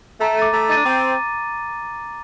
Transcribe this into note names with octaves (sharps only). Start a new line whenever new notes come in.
A3 A#5
D6 A6 D#7
A3 A#5
D#4 D6 A6 D#7
D4
C4 D6